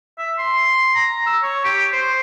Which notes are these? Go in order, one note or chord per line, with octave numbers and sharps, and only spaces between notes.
E5
C6
A#5
E6
C#5
G4
C5